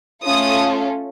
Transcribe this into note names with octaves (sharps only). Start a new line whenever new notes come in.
A3 C#4 F4 A4 D#6